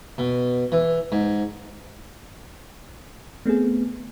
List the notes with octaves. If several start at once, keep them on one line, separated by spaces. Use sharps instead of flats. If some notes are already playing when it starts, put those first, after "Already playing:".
B2
E3
G#2
A3 B3 C4 G#4